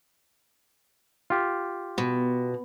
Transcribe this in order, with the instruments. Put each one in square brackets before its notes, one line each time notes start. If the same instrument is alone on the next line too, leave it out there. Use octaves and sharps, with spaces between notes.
[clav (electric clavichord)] F4 G4
[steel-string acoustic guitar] B2